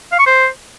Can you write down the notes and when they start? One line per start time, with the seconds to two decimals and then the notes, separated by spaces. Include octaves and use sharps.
0.12 F5
0.19 C#6
0.26 C5